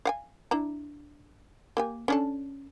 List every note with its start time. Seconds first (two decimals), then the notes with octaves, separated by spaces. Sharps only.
0.05 F5 F#5 G#5
0.51 D4 E4 A#5
1.77 A#3 G4 G#5
2.08 C#4 D4 A4